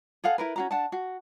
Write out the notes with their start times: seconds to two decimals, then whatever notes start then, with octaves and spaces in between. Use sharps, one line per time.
0.24 G#4 A4 F5 F#5
0.38 E4 A#4 B4
0.56 C#4 F#4 A#5
0.71 D4 F#5 A5
0.92 F#4